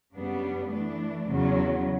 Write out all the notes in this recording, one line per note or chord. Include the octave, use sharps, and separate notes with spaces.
F#2 C#3 G3 B3 D4
E3 A3 D4
E2 C#3 F#3